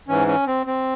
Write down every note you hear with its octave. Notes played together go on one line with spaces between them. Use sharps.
G#2 E3 C#4
C#4
C4
C4